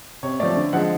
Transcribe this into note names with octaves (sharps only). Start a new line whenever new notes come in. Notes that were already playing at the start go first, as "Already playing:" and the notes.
C3 C#5
F3 A3 D5
D3
F3 G#3 F#5